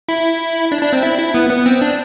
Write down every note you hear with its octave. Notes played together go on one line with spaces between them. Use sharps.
E4
D4
D4
C4
E4
E4
B3
B3
C4
D4